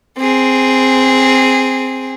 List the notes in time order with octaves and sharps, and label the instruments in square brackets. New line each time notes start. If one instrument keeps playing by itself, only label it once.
[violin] C4 G#4